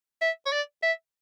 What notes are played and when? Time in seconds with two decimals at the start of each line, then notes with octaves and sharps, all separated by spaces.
0.21 E5
0.46 C#5
0.52 D5
0.83 E5